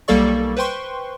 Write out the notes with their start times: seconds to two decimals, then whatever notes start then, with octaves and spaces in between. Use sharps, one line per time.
0.08 B1 G3 A#3 A4 D5 C#6
0.57 B4 C5 G5 C6 C#6